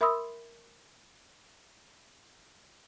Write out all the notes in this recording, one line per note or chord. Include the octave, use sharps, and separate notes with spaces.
A#4 E5 B5 C6 D#6 E6